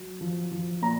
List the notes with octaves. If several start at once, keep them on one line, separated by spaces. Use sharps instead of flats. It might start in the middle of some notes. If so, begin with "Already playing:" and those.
Already playing: F#3
F3
F3
A#2 A#5